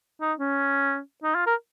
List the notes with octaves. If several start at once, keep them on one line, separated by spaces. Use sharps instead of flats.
D#4
C#4
D#4
F4
A#4